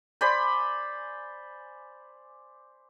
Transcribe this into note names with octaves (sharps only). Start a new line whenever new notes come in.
C5 D5 G#5 B5